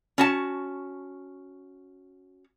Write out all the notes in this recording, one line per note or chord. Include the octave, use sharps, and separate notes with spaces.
C#4 F#4 A5